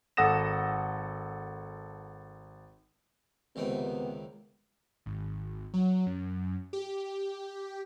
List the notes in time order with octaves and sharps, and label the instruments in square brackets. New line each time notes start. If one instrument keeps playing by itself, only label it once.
[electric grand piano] G#1 A4 F#5 D#6 A#6 E7
[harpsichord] C#2 D#3 C4 [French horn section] C3 B3
[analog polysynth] G#1
F#3
F#2
G4